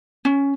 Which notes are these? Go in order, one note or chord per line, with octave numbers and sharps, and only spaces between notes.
C#4